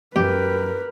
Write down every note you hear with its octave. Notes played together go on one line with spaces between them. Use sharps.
F#2 G4 A#4 B4